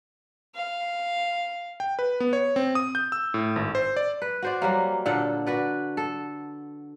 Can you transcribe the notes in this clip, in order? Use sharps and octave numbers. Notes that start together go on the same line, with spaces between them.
F5
G5
B4
B3
C#5
C4
D#6
G6
E6
A2
G#1
C5
D5
B4
F#4 C5 D5
F#3 G3 A#3
A#2 D3 A4 F#5
F#4 B4 D5
A4